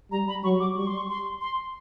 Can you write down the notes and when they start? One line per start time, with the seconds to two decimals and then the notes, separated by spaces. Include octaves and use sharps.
0.11 G3 A#5
0.28 B5
0.44 F#3 C#6
0.60 D6
0.76 G3 C#6
0.87 C6
0.97 C#6
1.09 C6
1.41 C6